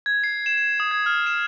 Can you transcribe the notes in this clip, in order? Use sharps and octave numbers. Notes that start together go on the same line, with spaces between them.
G#6
C7
E7
E7
D#6
G#6
F6
E7